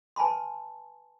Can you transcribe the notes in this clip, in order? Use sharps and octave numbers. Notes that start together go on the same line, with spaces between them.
B4 G#5 A5 B5 C6